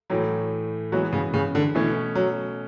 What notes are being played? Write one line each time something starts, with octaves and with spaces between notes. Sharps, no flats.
A2 E3 F#3 A3
E3 F#3 G#3 B3 F#4
C#3
C#3
D3
B2 E3 A3 C#4
F#3